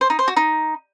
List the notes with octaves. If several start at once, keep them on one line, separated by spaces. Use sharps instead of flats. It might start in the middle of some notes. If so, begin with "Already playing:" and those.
C5
D#4
C5
F#4
D#4